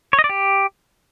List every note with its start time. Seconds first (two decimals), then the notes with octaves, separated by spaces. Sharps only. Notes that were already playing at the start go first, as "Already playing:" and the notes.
0.13 C#5
0.19 D#5
0.24 D5
0.29 G4